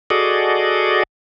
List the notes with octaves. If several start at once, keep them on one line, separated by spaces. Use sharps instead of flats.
F#4 G#4 A4 D5 D#5